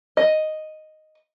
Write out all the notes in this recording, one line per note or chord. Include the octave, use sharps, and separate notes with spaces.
D#5